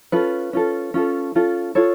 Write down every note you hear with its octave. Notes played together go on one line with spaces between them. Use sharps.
C#4 F4 A4 B4
C#4 F4 A4
C#4 F4 A4
C#4 F4 A4
F4 A4 C#5